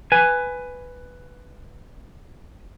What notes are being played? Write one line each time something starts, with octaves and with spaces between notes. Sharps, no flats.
B4 G#5